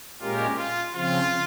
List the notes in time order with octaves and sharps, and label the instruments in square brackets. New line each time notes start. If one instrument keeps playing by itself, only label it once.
[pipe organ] A#2 G#3 C#4 G4 A#4 [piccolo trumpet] F4
[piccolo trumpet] F4
[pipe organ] C#3 F3 C4 [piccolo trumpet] F4